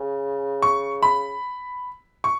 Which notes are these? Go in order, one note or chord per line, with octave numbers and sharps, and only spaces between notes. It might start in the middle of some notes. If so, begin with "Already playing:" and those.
Already playing: C#3
C#6
B5
C#6